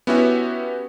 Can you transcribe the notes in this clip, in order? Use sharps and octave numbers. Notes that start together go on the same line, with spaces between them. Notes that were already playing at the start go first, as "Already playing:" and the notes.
B3 C#4 E4 F#4 G4 E5